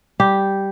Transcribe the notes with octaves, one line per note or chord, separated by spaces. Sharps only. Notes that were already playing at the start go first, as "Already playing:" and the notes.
G3 G4